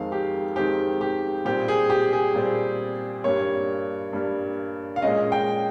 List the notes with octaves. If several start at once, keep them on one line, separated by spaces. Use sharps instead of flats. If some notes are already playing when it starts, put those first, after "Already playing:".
Already playing: F2 D#3 G#3 C4 F5
G4
F2 D#3 G#3 C4 G4
G4
A#2 G3 C4 G4
G#4
G4
G#4
A#2 G3 C4
G2 G3 A#3 C#5
G2 G3 A#3
F5
A#2 G#3 C#4 D#5
G5